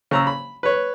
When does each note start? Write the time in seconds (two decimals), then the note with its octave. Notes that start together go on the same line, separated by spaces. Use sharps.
0.11 C#3 A#5 E6
0.27 B5
0.63 B4 C#5